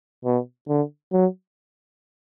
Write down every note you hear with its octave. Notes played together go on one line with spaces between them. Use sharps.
B2
D3
F#3